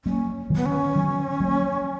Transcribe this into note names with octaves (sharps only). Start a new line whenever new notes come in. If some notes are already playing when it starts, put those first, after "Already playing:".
F#3 A#3 C#4
D#3 F#3
B3
C#4
D#3 F#3
F#3 A#3